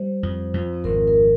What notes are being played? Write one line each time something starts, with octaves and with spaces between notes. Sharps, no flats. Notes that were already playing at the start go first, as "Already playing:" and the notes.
Already playing: G3 C5
F2
F2
G#1 A#4
A#4